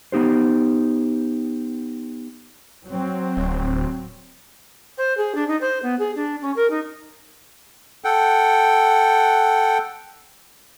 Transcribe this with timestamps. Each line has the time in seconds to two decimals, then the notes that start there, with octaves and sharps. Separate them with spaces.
0.12 B3 D#4 G4 C5
2.87 F#3 C4
3.37 D1
4.97 C5
5.17 G#4
5.35 D4
5.48 D#4
5.61 C5
5.82 B3
5.99 G#4
6.15 D4
6.41 C#4
6.56 A#4
6.70 D#4
8.05 A4 F#5 G5